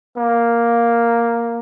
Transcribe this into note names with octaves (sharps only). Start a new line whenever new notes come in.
A#3